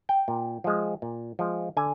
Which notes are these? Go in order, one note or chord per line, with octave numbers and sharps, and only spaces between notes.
G5
A#2
F3 G#3
A#2
F3 G#3
D3 G#5